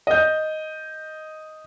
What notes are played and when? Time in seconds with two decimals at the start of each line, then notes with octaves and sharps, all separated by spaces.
0.07 D#5 G6